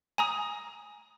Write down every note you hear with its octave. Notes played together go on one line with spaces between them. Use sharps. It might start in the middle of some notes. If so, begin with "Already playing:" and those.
G#5 A#5 D#6